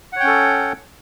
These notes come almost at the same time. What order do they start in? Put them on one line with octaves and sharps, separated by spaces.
F#5 C#5 G5 C#4 A4